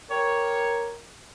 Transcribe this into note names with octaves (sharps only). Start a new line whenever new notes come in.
G4 A#4 C#5